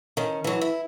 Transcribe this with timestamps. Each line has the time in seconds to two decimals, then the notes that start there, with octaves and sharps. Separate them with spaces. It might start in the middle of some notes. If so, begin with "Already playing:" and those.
0.17 D#3 C#4
0.44 E3 F#3
0.61 E4